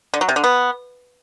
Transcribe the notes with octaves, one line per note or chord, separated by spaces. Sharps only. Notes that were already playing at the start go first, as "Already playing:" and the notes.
D3
F#3
C3
D3
B3